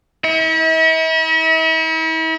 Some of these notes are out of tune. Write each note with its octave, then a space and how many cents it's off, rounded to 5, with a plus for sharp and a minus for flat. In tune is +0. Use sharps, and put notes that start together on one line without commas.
E4 -40 E5 -45